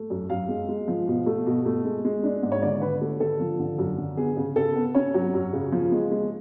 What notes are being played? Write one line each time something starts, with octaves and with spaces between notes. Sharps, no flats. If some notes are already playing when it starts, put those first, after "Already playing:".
Already playing: A3
F#2
F#2 F5
G#3
G#3
F3
B2
A3
B2
A3
G#3
G#3
D4
G#2
C#5
D3 D5
D3 B4
A3
D3 A4
F3
D3
F#2
D3
B3 G#4
C#3
C#3 A4
B3
C#4 C#5
F#3
F#2
C#3
F3
G#3
G#3